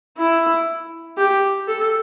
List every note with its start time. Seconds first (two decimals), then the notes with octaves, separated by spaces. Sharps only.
0.18 E4
1.18 G4
1.67 A4